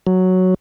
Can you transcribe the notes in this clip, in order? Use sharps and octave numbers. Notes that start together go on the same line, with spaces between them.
F#3